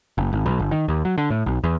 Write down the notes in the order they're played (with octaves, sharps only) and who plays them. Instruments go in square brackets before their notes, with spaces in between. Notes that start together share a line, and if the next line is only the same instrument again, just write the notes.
[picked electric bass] F#1
G#1
B1
G1
D#3
D#2
F#3
D3
A2
B1
E2